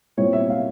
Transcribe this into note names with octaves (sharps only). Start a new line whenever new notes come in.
A#2 G3 C4 E4 C#5
E5
F5